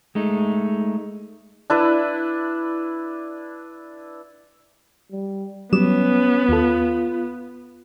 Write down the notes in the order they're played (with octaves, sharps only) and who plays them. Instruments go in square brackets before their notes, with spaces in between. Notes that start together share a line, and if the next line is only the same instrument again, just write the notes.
[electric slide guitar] G#3 A3 D#4
[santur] D4 E4 B4
[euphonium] G3
[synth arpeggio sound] F#3 G3 E7 [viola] B3 [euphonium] C#4
[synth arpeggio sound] D#2 A4 [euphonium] F4